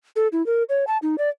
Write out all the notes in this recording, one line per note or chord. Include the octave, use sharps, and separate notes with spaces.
A4
E4
A#4
C#5
A5
D#4
D5